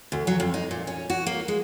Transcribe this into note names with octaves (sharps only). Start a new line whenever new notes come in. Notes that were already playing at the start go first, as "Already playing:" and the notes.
D2
F#3
F2
D#4
A#2
C#4
F#4
A#3
G#3